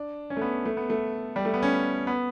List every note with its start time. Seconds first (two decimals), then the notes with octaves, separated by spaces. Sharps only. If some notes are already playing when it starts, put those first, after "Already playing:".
Already playing: D4
0.30 C#4
0.37 A3
0.41 B3
0.65 A3
0.77 B3
0.90 A3
1.36 G3
1.45 A3
1.54 B3
1.63 C#4
2.07 B3